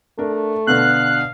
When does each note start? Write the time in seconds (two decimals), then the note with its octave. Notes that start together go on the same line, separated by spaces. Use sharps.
0.19 A3 D4 A#4
0.67 B2 D3 B4 F5 F#6